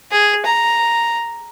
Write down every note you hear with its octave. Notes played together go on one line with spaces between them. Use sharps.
G#4
A#5